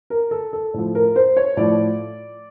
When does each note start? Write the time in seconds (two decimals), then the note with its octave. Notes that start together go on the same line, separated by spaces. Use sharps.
0.10 A#4
0.31 A4
0.53 A4
0.74 A2 F3
0.95 A#4
1.16 C5
1.37 C#5
1.57 A2 F3 D5